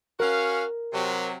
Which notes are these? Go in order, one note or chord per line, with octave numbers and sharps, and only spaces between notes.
C#4 F#4 A#4 F5
C3 F#3